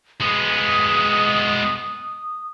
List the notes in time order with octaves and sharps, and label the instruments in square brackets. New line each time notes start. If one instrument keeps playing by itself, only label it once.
[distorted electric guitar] G#3 B3 [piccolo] D#6